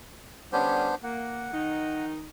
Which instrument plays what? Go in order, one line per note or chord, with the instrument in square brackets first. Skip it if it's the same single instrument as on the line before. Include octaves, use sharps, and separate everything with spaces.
[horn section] D3 G3 C#4 [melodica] B3 D4 C5
[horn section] A#3 [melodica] F#5
[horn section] D#3 D#4